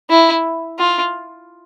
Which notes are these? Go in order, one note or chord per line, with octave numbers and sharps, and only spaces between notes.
E4
F4